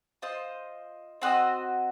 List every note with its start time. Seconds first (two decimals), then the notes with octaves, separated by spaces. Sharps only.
0.22 F4 C5 D#5
1.22 C4 F#4 C5 D#5